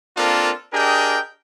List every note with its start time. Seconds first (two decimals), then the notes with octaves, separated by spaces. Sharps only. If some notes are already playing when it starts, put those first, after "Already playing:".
0.17 A#3 C4 D4 F4 A4 A#4
0.73 D4 G4 G#4 A#4 D#5 G5